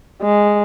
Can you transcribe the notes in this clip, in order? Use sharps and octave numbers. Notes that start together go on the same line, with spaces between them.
G#3